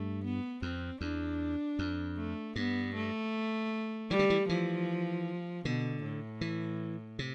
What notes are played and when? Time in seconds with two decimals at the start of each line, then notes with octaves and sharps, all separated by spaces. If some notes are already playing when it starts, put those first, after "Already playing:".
Already playing: G2 A3
0.24 B3
0.62 F2 C4
1.01 E2 D4
1.79 F2
2.17 A3
2.56 G2 B3
2.95 A3
4.10 E3 G3
4.19 D3
4.30 E3
4.48 E3 F3
5.65 B2 D3
6.03 A2
6.41 E3
7.19 C3